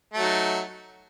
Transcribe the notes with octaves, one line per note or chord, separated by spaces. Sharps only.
F#3 A3 D#4